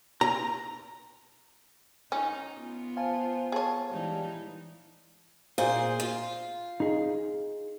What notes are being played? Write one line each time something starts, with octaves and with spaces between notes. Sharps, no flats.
A#5
C#4 D#4
B3 F4
C5 F5 G#5 A5
G#4 C#5 F5 A5
E3 G3 G#3 D#4
A#2 G#4 C5 F5
F4
D#4 G#4